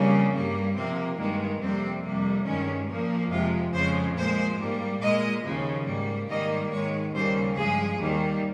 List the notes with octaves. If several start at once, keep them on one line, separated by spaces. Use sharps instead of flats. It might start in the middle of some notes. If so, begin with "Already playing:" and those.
Already playing: F2 C#3 G3 A#3
G2 G3 A#3
C3 F3 A#3 C4
G2 D#3 G#3 A#3
F2 C3 G3 A#3 C4
F2 C3 G3 A#3
G2 D#3 G#3 C#4
A#2 F3 A#3
F2 C3 F3 G#3 F4
F2 C#3 F3 G#3 C5
A#2 F3 G#3 C5
G#2 G3 A#3
A#2 G#3 D#5
D#2 C#3 F3
G#2 G3 A#3
G#2 D#3 G3 A#3 D#5
G#2 D#3 G#3 C#5
D#2 C#3 G3 A#3 C5
G2 F3 G#3 G#4
D#2 D#3 G3 A#3